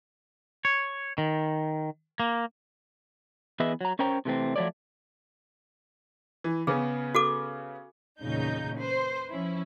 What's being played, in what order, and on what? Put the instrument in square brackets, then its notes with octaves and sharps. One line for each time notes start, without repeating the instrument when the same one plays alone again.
[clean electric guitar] C#5
D#3
A#3
[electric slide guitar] E3 B3 G#4 B4 D#5 E5
F#3 A#5
C#4 A#4 C5 C#5 G5 A#5
C3 E3 A3 C4
F3 F#3 A3 C#5 D5
[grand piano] E3
[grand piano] C#3 B3 C#4 [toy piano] G#4
[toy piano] F#4 A4 D6
[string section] E2 A#2 C#3 D#4 G6
B4 C5
F3 C#4 E4